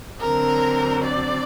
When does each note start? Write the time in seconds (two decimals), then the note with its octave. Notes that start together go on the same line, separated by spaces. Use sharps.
0.20 D3 F#3 C4 A#4
1.03 D5